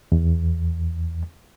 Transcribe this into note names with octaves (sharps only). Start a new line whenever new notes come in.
E2